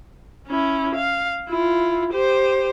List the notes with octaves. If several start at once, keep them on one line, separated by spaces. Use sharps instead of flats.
C#4 E4
F5
E4 F4
G4 C5